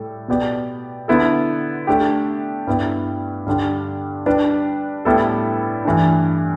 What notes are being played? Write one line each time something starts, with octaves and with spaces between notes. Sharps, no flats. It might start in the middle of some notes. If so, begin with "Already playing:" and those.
Already playing: A2 G3 A4
B2 B3 G4 D5
D3 B3 E4 A4
A3 D4 G4
G2 G3 B3 E4
G2 D3 G3 D4
G3 D4 B4 D5
A2 G3 B3 E4 A4
G2 E3 A3 D4